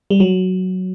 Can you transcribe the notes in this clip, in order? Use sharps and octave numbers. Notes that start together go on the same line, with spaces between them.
G3
F#3